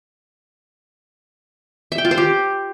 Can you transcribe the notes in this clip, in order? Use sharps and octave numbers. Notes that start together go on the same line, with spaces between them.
E5
G5
F4
C5
G4